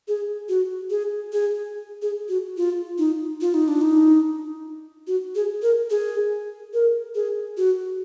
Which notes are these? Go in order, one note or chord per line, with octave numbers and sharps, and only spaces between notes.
G#4
F#4
G#4
G#4
G#4
F#4
F4
D#4
F4
D#4
D4
D#4
F#4
G#4
A#4
G#4
A#4
G#4
F#4